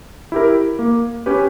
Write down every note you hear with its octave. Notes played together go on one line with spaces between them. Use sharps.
E4 G4 A#4
A#3
C#4 G4 B4